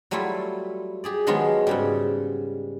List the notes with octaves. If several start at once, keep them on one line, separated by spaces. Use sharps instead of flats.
F#3 G3 A3 E4 F4
G4 G#4 D5
D#3 F3 F#3 G#3 B3 F4
G#2 C#3 G3